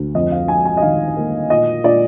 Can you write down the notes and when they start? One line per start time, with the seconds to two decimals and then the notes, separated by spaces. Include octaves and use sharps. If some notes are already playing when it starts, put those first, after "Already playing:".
Already playing: D2
0.14 F2 D#5
0.32 F5
0.48 F2 G#5
0.65 G#5
0.77 D#5
0.82 D#3 F5
1.17 A#3
1.50 A#2 D#5
1.84 A#2 D5